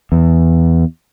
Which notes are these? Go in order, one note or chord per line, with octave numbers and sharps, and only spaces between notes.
E2